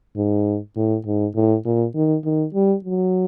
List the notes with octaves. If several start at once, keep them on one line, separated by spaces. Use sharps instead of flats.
G#2
A2
G#2
A2
A#2
D#3
D#3
G3
F#3